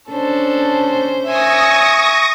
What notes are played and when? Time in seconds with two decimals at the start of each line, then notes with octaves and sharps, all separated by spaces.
0.10 C#4 D4 A4 C5
1.27 E5 G#5 C#6 D#6 A#6